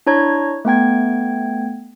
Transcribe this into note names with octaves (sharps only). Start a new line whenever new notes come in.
D4 E4 C#5 A#5 G#6
A3 B3 G5 G#6